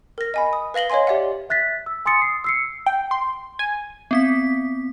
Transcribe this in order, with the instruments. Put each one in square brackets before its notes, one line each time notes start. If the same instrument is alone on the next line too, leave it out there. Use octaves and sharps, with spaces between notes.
[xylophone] A#4 A#6
D#5 G#5 B5
D#6
B4 F5 A#6 F#7 G7
C#5 D#5 F5 G#5 C6
G4 D5 E5 F#5
[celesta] E5 F#6 A6 B6
E6
G#5 C6 D#6 A6 C#7
D#6 C7
E6 C7 C#7
[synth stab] G5
C6
G#5
[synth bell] B3 C4 B6